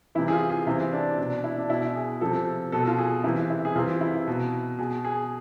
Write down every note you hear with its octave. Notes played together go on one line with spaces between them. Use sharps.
C3 E3 E4
G#4
F4
G#4
C3 E3 E4
D4
B2 D4
E4
D4
B2 E4
G#4
C3 F3 A4
B2 A4
F4
G#4
C3 E3 E4
E4
G#4
C3 E3 F4
E4
B2
B2 G#4
G#4